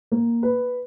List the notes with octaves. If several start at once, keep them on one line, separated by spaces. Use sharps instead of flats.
A#3
B4